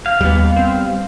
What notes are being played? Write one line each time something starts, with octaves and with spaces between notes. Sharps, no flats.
F5
D#2 G3 B3
C4